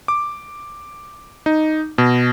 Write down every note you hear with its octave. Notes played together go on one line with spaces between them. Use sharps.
D6
D#4
B2